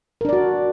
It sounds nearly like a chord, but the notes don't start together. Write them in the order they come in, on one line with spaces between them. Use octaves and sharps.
A#4 D4 D5 F#4